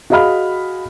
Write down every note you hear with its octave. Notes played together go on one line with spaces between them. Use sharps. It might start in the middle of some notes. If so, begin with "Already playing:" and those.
F#4 G#4 D#5 F5 B5 F6